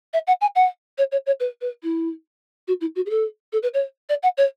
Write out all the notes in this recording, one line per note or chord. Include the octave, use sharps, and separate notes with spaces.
E5
F#5
G#5
F#5
C#5
C#5
C#5
B4
B4
E4
F#4
E4
F#4
G#4
A4
A4
B4
C#5
D5
F#5
C#5